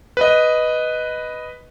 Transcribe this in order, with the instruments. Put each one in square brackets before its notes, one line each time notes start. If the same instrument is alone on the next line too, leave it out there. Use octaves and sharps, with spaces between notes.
[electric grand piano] B4 D#5